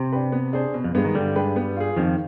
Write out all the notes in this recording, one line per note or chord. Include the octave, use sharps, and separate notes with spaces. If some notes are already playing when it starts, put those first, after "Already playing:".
Already playing: C3
D4 G4 B4
B3
D4 G#4 C5
B2
F2
G2 G#3 B3
D#3
G2 D3 G3
G#3 D4 G4 B4
B3
F4 G#4
F2 D#3 F3